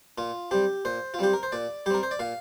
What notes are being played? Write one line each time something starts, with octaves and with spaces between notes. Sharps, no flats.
A#2 F4
G3 C4 G4
A#2 C5
F4
G3 C4 G4
A#4
C5
A#2 D5
G3 C4 G4 A#4
C5
D5
A#2 F5